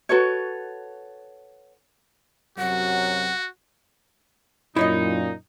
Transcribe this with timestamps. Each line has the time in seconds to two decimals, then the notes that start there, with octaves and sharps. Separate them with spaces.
0.09 F#4 A4 B4 C#5
2.58 F#2 C3 F#3 F#4 F#5
4.76 F#2 A#2 D#4 E4 C#5 D#5